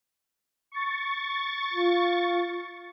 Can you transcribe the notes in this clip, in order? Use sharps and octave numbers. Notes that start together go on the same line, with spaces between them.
C#6 A6
F4